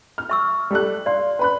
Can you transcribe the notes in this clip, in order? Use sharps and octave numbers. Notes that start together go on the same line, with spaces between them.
F6
E5 C#6 E6
G3 A4 F#6
D5 F5 C6
B4 B5 F#6